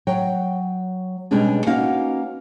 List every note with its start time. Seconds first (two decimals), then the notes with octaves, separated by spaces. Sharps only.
0.07 F#3 G5
1.31 B2 G3 G#3 C#4 D4 G#4
1.66 A#3 B3 C#4 D#4 F#4 F5